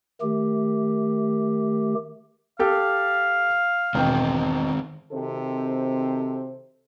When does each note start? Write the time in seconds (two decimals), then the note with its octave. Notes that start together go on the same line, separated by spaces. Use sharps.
0.21 D#3 A3 G4
2.59 G4 A4 F5
3.95 E1 B2 D#3 C4 G5
5.12 C3 D#3 C4 F#4 A4 C5